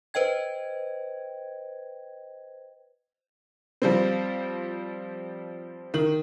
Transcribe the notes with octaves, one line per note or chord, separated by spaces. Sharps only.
B4 C5 D#5 G5 G#6
F3 G3 C4
D#3 F#7